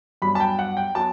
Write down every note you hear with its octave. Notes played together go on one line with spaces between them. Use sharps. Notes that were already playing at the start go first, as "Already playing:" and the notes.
G2 F#3 B3 B5
A5
G5
F#5
G5
F#3 B3 A5